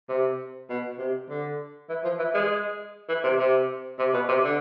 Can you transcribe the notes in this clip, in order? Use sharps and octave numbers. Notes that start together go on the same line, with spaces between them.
C3
B2
C3
D3
E3
F3
E3
G#3
E3
C3
C3
C3
B2
C3
D3